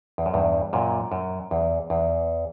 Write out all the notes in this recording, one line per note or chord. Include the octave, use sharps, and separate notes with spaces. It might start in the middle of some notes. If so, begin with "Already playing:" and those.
E2
F#2
E2 G2
F#2 A#2
F#2
E2
E2